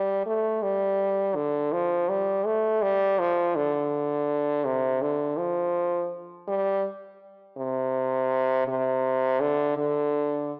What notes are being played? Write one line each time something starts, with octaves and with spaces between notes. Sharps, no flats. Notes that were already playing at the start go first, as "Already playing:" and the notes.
Already playing: G3
A3
G3
D3
F3
G3
A3
G3
F3
D3
C3
D3
F3
G3
C3
C3
D3
D3